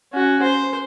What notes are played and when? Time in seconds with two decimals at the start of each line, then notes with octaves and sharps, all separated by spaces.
0.13 C#4 F#4
0.43 C5